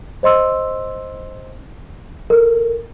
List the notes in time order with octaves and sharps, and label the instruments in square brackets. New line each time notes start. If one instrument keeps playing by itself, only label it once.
[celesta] C5 D#5 C6 E6
A4 A#4